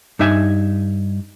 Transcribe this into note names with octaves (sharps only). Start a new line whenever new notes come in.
G2 D#4 E5 G#5